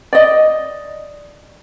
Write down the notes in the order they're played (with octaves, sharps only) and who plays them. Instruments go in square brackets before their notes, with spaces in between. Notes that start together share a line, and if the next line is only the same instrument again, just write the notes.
[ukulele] D5 D#5